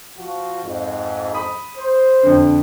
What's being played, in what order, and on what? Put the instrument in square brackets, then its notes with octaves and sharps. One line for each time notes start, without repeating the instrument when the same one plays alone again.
[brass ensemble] F3 F4 F#4
F2 G#2
[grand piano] B5 D#6
[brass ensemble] C5
[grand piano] F2 D3